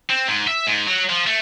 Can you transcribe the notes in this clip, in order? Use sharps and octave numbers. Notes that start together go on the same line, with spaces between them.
C4
G#2
E5
G#2
F#3
F3
A3